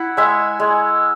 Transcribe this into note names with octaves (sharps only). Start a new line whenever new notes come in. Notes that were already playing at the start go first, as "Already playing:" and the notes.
Already playing: E4 F#5 B5
G#3 E5 G#5
G#3